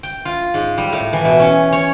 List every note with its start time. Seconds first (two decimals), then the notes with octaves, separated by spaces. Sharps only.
0.03 G5
0.25 F4
0.54 G#2
0.78 G3
0.92 A2
1.13 E3
1.25 B2
1.39 C#4
1.73 C#5